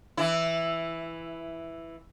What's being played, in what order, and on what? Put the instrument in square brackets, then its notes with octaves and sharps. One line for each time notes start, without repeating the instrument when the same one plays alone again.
[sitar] E3 E4